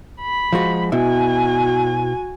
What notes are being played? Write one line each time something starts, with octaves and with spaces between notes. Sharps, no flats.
B5
F3 G#3 F#4
B2 E4 F#4 G#5